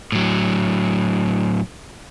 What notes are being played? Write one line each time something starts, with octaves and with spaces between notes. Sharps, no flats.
A2 F#3